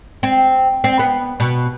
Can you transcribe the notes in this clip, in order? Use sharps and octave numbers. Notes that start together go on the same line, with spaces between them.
C4
C4
B3
B2